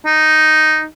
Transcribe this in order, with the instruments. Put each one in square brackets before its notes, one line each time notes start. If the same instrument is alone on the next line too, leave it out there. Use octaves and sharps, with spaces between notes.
[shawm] D#4